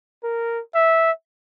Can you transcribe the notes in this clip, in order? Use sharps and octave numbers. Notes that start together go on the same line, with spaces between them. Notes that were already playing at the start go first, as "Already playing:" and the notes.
A#4
E5